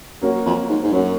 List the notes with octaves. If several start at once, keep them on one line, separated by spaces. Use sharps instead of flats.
F#2 F#3 A#3 C#4 F#4
F2
G#2
G#2
F#2 F#3 A#3 C#4 F#4